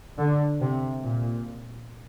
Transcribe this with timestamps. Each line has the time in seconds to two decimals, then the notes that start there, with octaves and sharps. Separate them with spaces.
0.18 D3
0.61 C3
1.04 A#2